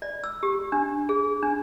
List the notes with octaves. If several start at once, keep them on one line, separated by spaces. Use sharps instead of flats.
D5
E6
G4
D4
G#4
D4